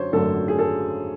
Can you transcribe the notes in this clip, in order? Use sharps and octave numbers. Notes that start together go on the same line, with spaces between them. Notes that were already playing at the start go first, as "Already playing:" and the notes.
Already playing: F#2 D3 F#3 C5 C#5
G#1 F#2 D3 F#3 A3 A4
G#4
A4